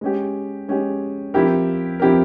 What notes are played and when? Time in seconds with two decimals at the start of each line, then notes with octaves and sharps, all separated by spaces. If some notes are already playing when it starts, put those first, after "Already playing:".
0.01 G#3 C#4 G4
0.69 G#3 C#4 G4
1.34 F3 C4 E4 G4 A#4
2.00 F3 C4 E4 G4 A#4